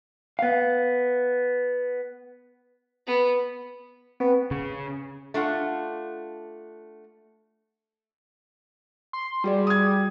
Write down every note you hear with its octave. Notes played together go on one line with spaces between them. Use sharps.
B3 F5
B3
B3 C4
C#3
A3 D4 F4 F#5
C6
G3 F#4 G#4 D5
D#6 G#6